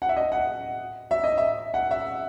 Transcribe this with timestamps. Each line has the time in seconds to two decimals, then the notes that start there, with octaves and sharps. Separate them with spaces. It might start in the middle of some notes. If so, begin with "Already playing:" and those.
0.02 F#5
0.09 E5
0.17 D#5
0.32 F#5
1.11 E5
1.24 D#5
1.37 E5
1.74 F#5
1.91 E5